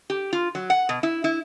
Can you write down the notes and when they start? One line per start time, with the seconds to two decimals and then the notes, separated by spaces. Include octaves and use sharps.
0.10 G4
0.33 F4
0.55 F#3
0.70 F#5
0.89 B2
1.03 E4
1.24 E4